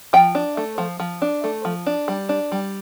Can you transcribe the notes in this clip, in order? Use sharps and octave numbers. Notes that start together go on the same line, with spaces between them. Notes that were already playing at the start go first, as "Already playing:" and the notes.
F3 G5
D4
A3
F3
F3
D4
A3
F3
D4
G3
D4
G3